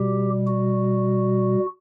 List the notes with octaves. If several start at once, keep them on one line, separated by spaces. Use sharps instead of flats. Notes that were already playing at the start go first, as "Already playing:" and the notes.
Already playing: B2 G3 G4
F#4